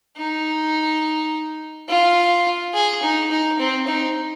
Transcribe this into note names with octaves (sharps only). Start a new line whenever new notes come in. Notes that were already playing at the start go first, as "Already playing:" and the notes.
D#4
F4
G#4
D#4
D#4
C4
D#4